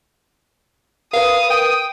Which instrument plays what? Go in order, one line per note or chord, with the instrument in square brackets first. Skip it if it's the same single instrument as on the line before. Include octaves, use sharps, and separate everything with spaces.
[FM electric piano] A#4 B4 [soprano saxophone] F5 [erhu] D#6
[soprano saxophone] G5